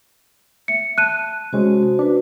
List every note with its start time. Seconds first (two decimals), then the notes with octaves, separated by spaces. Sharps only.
0.68 E5 C#7
0.98 A5 F#6 D#7
1.53 C3 G#3 C#4 F#4 C5
1.99 D4 F#4 B4